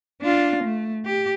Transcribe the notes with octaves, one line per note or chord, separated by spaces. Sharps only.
D4 F4
A3
G4